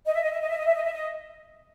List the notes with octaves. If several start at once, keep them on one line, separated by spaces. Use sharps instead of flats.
D#5
E5
D#5
E5
D#5
E5
D#5
E5
D#5
E5
D#5